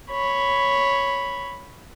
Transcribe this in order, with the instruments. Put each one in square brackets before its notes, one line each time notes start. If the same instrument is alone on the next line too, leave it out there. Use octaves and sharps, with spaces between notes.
[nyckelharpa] C#5 B5